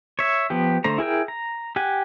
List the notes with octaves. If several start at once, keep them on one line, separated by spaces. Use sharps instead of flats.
C#5 E5
F3 B3 G4
D3 A3 C5 A#5
E4 G#4 A#4 G5
A#5
G4 F#5 G#5